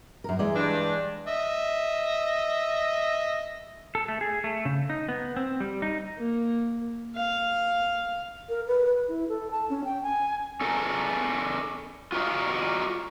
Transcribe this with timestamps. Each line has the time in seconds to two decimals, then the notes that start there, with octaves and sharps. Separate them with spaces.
0.24 F#2 A#4
0.39 E3 G#3 D5
0.56 G2 D4
1.27 D#5 E5
3.95 A4
4.08 A3
4.21 G#4
4.44 A3
4.65 C#3
4.90 D#4
5.09 B3
5.36 C4
5.60 G3
5.82 D#4
6.18 A#3
7.16 F5
8.49 A#4
8.67 B4
8.86 B4
9.08 E4
9.29 A4
9.51 A5
9.70 C#4
9.85 G5
10.03 G#5
10.61 C#4 A4 A#4
12.12 F4 F#4 A#4 B4 D#5 F5